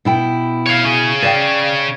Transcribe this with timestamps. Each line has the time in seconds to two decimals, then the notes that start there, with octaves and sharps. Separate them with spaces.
0.05 B2 E4 G5
0.67 C#5 F5
0.85 C#4 G#4
1.22 D5 F5 G5